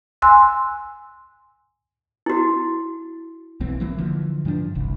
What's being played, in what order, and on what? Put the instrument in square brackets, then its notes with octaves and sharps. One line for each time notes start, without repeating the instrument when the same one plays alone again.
[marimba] G#5 C6 E6 F#6
[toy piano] E4 F#4
[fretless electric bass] B1 E3 C4
E3 F#3 A#3
D3 E3 F3
G2 F3 C4 D4
F1 C2